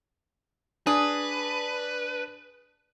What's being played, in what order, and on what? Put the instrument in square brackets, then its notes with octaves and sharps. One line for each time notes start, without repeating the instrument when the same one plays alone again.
[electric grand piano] D4 [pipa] G#4 [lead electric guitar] B4